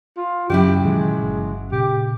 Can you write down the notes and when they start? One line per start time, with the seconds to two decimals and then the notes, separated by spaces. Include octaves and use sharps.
0.17 F4
0.50 F#2 C#3 E3 F#3 E4 G4
0.84 A#2 D#3 E3 G#3
1.22 G1
1.72 A#2 C#3 G4